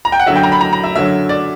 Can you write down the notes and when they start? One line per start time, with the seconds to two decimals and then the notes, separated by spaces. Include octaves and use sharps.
0.05 A#5
0.12 G5
0.20 F#5
0.26 F#2 D3 F#3 E5
0.36 G5
0.43 A#5
0.52 B5
0.61 A#5
0.73 A#5
0.84 E5
0.96 F#2 D3 F#3 E5
1.29 D5